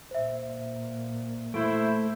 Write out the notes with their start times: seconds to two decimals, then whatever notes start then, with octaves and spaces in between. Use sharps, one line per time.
0.11 A#2 C5 E5
1.54 A3 E4 C5 D7